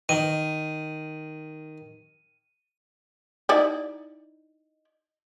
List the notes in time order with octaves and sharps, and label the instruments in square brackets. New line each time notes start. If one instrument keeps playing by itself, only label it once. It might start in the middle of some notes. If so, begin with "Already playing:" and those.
[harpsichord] D#3 [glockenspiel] D#7
[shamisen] D#4 E4 D5